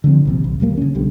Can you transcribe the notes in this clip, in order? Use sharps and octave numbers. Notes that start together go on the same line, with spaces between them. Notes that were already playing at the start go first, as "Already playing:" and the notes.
D3 F3 B3 C4
A#1 D#2 C3
B1
E1 D#2 G3 A#3
C#3 C#4
C2 B2 D3 G3